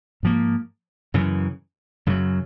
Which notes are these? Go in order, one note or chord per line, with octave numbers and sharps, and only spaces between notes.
G#2 F3 A#3
F#2 C#3 E3
F#2 C#3 F#3